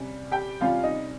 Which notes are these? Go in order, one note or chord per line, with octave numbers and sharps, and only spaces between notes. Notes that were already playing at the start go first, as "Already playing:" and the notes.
Already playing: C3 G3 C#4
G4 G5
C3 G3 C#4 F4 F5
D#4 D#5